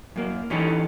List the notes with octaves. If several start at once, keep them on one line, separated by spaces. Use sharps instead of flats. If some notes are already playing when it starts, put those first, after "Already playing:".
F#2 A#3
E3 C#4 D#4 G4 A4